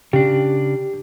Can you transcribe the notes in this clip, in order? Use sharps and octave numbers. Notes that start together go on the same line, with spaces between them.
C#3 D4 G4